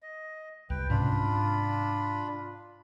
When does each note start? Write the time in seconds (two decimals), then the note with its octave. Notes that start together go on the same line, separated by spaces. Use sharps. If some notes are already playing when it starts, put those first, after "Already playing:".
0.02 D#5
0.70 C2 B4 G5
0.90 G#2 C3 C#4 D4 F4 B5